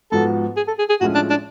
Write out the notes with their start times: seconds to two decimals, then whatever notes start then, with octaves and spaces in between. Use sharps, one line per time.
0.12 G#2 F3 B3 F#4 A4
0.57 G#4
0.68 A4
0.79 G#4
0.90 G#4
1.01 A2 F3 G#3 C#4 F#4
1.15 D4
1.30 D4